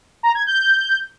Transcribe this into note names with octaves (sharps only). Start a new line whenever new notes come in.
A#5
G#6
G6